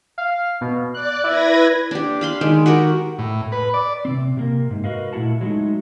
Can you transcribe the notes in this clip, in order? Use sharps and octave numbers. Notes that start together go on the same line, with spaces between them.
F5
B2
D5 F#6
E4 B4 G#6 A#6
D4 G4
F5 B5 C6
D#3 G#3 G4
F#4 G4 A#4
A2
B4
D5
C3 C4
C3 A#3 A#4
G#2
F#4 A#4 B4 D#5 F5
A#2 A3 E4 A4 F#5 A5
F#3 G#3 A3 D#4